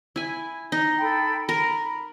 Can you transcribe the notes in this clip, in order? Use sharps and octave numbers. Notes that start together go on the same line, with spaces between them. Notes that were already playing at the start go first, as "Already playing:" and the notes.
E4 G#5
D#4
A4 G5 B5
A#4 B5